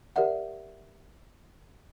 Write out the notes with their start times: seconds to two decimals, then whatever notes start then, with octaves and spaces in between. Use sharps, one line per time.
0.16 G4 A#4 D5 E5 F#5